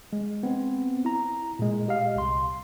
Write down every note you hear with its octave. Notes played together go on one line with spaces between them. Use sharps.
G#3
B3 C4
E4 A#5
A#2 G#3
G4 D#5 F5
C2 C6